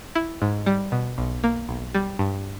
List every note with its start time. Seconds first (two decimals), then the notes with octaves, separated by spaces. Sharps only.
0.15 E4
0.42 G#2
0.66 G3
0.92 B2
1.18 B1
1.44 A#3
1.69 B1
1.94 G3
2.19 G2